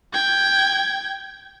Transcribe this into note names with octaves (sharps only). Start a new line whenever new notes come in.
G5 G#6